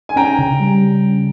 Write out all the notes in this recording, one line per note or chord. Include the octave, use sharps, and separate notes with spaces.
G#5
C#4 G5 A#5
C#3
G3